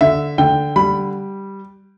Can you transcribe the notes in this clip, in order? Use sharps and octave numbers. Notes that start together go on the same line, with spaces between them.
D3 E5
D3 G5
G3 B5